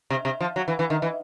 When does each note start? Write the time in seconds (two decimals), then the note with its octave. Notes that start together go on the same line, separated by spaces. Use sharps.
0.10 C3
0.25 C3
0.41 F3
0.56 F#3
0.68 E3
0.79 E3
0.90 D#3
1.02 E3